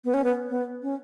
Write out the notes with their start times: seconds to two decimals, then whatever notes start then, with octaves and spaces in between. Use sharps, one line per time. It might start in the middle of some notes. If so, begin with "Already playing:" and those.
0.05 B3
0.14 C#4
0.24 B3
0.50 B3
0.82 C#4